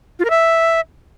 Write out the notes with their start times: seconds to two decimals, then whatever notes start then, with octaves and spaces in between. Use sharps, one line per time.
0.19 F4
0.25 A#4
0.30 E5